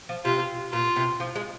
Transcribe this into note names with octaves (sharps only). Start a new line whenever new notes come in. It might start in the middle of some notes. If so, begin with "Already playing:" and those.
F3
C3 F4
A#2 F4
C3
F3
G#3